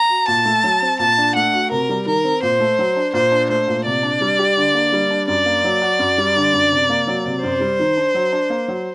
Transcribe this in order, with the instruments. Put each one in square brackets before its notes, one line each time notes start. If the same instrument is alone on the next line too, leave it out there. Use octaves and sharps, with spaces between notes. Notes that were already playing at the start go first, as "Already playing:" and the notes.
Already playing: [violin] A#5
[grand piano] F#4
[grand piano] A#2 [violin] A5
[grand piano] A3
F#3
C4
[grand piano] A#2 [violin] A5
[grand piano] D4
[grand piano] A3 [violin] F#5
[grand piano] F#4
[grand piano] C3 [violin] A#4
[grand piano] G3
[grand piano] D#3 [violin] A#4
[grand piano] C4
[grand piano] A#2 [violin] C5
[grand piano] A3
F#3
D4
[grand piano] A#2 [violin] C5
[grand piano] D4
[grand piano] A3 [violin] C5
[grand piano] A#2
[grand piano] C3 [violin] D5
[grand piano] D4
G3
G4
D3
A#3
G3
D4
[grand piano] F#2 [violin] D5
[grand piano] A#3
F#3
F#4
F#2
G3
D3
F#2
C3
A#3
F#3
C3
[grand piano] F#2 [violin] C5
[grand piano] G3
D#3
D4
F#3
D4
A#3
F#3